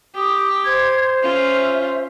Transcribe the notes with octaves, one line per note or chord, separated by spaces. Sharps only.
G4 D#6
C5 G#6
C#4 F4 E5